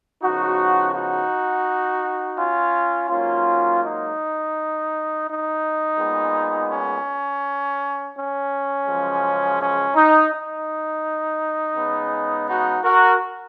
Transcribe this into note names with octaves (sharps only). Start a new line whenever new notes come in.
C#3 F3 B3 D#4 F#4
D#4 F#4
C#4 F4
G#2 F#3 A#3 C#4 F4
D#4
D#4
A#2 G#3 B3
C#4
C#4
F#2 C#3 F3 G#3
C#4
D#4
D#4
C#3 G#3 B3
D#4 F#4
F#4 A#4